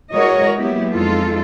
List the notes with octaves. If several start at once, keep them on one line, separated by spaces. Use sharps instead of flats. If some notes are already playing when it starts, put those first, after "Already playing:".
E3 G#3 F#4 A#4 C#5 D#5
F#3 G#3 A#3 B3 E4 G4
F2 G#3 D#4 F4 A4